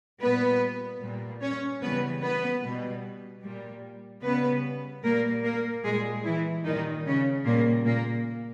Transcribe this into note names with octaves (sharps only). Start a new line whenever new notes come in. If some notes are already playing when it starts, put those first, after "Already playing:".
A#2 G3 B3 B4
A#2 G3
C#4 C#5
C#3 E3 G3 B3 B4
B3 B4
B2 G3
A#2 G3
C#3 G3 B3 B4
A#2 G3 A#3 A#4
A#3 A#4
A#2 G3 G#3 G#4
E3 E4
A#2 D#3 G3 D#4
C#3 C#4
A#2 C#3 G3 A#3
A#2 A#3